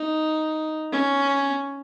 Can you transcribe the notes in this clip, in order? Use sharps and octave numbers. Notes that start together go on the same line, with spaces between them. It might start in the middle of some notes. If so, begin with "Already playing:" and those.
Already playing: D#4
C#4